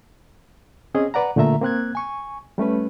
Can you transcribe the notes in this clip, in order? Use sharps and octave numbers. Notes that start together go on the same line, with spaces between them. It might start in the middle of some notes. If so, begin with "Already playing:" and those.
C4 C#4 G#4 D#5
B4 D5 F#5 A#5
A#2 D3 A3 F4 E5 A#5
A#3 C4 F#6 G#6
G#5 C#6
G3 A3 C#4 B4